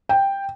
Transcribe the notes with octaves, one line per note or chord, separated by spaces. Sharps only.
G5